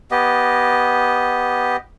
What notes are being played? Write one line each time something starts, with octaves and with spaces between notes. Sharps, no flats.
B3 G4 D#5